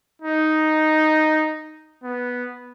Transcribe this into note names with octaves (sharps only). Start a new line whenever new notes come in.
D#4
B3